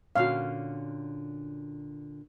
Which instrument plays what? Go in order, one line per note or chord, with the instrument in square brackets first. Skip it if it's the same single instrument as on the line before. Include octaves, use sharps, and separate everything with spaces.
[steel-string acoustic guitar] A#2 D3 [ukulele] C#4 F#4 [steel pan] F5